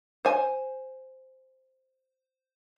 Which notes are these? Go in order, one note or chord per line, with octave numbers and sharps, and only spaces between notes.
C5 G#5